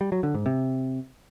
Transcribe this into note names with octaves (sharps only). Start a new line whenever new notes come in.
G3
F#3
D3
G#2
C3